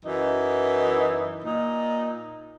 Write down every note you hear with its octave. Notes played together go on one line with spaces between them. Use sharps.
F#2 E3 D#4
A#2 D#4